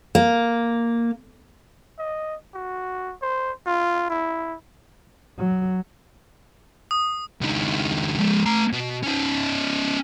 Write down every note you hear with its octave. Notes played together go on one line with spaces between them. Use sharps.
A#3
D#5
F#4
C5
F4
E4
F#3
D#6
C#2 D#3
F3 G#3
A3 A#5
B2
C#4 D#4